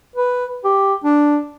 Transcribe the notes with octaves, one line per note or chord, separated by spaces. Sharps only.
B4
G4
D4